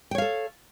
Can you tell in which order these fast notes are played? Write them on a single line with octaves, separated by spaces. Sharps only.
G5 C#5 F5 A4